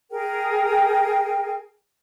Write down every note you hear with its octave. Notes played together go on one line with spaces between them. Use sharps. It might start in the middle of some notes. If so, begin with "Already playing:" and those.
G#4 A#4 G5